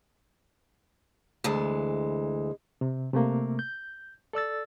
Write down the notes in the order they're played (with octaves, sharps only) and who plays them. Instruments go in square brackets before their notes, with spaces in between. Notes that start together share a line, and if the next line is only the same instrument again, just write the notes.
[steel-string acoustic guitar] D2 E3 G#3
[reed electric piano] C3
C3 A3 A#3
G6
A4 D5 E6 A6